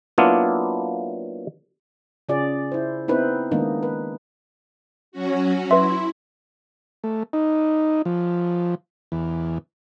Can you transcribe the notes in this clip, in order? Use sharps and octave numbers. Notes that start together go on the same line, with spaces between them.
F#3 A#3 B3 D4 E4 F4
C#3 C#4 F4 G#4 D5
E4 C5
B3 C4 D#4 E4 B4 C5
D#3 G#3 A#3 B3 D4 D#4
B4
F#3 C#4 F#4
E4 B4 E5 C6
A3
D#4
F3
E2